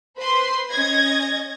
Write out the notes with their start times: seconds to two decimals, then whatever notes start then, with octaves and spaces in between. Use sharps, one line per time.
0.18 B4 C5 B5 C6
0.71 C#4 D#5 G#6 A#6